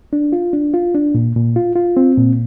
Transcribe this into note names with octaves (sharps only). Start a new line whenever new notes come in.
D4
F4
D4
F4
D4
A#2
A#2
F4
F4
C4
A#2